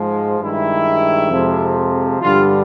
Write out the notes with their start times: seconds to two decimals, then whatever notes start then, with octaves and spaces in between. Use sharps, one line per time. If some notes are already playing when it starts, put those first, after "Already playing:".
Already playing: G#2 F3 G#3
0.40 G2 D#3 G#3 E4
1.30 F2 C3 F3 G#3
2.20 G2 D3 G3 F4